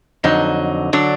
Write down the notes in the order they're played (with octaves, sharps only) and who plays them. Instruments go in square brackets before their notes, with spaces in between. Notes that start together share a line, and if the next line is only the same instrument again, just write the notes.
[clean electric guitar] F2 D3 F#3 [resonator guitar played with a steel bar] D#4
[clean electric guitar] D3 F#3 [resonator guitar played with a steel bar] D4